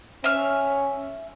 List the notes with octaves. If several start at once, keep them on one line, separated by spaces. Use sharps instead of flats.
C#4 E5 F6